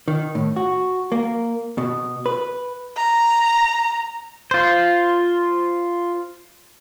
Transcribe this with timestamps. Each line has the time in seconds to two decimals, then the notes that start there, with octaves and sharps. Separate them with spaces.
0.08 D#3
0.35 A2
0.56 F#4
1.12 A#3
1.78 B2
2.26 B4
2.96 A#5
4.51 F4 C5